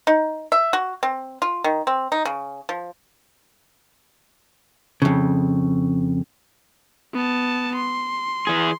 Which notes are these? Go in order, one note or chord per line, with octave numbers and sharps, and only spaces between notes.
D#4
E5
F#4
C4
F4
D#3
C4
D#4
C#3
F3
F2 C#3
B3 A5
C6
E3 G#4